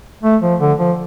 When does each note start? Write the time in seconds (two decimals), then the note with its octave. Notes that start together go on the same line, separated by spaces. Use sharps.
0.23 A3
0.42 F3
0.60 D3
0.79 F3